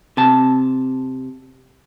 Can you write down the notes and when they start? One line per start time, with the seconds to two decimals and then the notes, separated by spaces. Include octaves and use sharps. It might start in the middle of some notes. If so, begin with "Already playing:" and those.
0.17 C3 A5